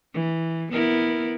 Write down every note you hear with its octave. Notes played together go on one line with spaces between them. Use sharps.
E3
B3 E4 A#4